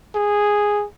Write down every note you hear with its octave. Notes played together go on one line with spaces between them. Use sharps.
G#4